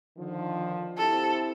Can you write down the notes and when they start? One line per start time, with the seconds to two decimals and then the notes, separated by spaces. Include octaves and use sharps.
0.17 D3 D#3 F3
0.98 C4 E4 G4 A4